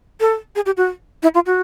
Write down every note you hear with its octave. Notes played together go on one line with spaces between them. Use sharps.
A4
G#4
G4
F#4
E4
F4
F#4